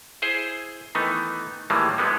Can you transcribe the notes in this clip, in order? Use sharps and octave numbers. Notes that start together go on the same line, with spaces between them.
E4 G#4 C5
D#3 E3 A3 B3 D#4
A2 D#3 E3 G3 G#3 A#3
F3 G3 G#3 B3 D#4